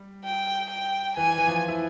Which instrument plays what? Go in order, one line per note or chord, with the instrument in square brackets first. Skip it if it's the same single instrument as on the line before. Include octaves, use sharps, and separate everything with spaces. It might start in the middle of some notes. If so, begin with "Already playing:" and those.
Already playing: [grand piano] G3
[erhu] G5
G5
[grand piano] E3 [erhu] G#5
[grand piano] E3
F3
E4